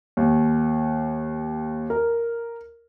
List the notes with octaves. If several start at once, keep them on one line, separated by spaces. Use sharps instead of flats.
D#2
A#4